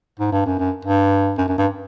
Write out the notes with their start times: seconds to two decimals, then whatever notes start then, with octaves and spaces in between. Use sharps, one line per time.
0.19 G#2
0.32 G2
0.46 F#2
0.59 F#2
0.85 G2
1.38 F#2
1.48 F#2
1.58 G2